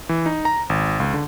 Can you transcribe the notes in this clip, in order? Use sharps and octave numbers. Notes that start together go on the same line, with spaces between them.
E3
D#4
A#5
G#1
C#2
D3